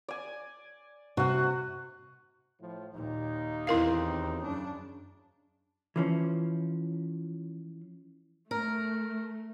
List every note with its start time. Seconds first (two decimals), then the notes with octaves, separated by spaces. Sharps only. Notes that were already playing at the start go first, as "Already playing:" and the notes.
0.08 D5 G#5
1.17 C3 F#4 F#5
2.60 A2 F3
2.95 D#2 A#2 D#4
3.67 E2 C4 E4 A#4 F5
4.42 F#2 C#3 D4
5.96 E3 F3 C#4
8.51 A3 A#4